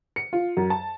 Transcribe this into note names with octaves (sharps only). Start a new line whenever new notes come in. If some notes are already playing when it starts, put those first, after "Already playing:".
C#7
F4
F#2
A5